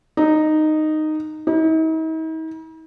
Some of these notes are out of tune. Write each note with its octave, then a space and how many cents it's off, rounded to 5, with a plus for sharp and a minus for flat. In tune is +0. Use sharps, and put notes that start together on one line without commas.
D#4 -10
D#4 +45